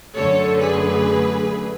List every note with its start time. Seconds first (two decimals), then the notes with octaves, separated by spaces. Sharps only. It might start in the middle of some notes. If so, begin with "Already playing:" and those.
0.16 F#2 D3 A3 A4 C#5
0.62 G#4 B4